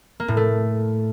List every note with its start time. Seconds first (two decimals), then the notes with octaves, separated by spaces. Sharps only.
0.20 A#3
0.28 A2
0.37 A3